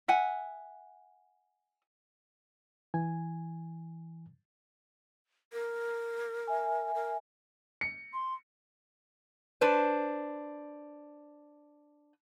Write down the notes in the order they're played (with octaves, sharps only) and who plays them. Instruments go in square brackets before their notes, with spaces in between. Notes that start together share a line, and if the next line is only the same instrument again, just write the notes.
[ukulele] E5 F#5 G#5
[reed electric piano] E3 G#5
[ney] A#4
[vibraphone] E5 G#5
[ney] A#4
[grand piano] C#7
[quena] C6
[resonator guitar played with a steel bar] D4 B4 C5